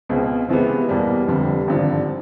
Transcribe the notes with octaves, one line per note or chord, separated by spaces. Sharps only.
C#2 B2 G#3 C4
C#2 C3 E3 G#3 B3
E2 B2 G3 A#3
F1 F2 D3 G3
G#1 G2 D3 F3